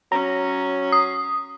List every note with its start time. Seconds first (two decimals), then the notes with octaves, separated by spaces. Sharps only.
0.12 F#3 C#4 A#5
0.92 D#6